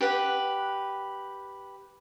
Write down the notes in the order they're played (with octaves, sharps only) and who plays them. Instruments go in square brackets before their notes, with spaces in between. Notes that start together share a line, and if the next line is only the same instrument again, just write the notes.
[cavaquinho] G4 B4 F#5